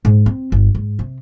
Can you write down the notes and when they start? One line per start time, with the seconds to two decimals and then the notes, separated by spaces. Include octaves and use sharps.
0.05 G#2
0.26 C4
0.52 G1
0.75 G#2
0.99 C3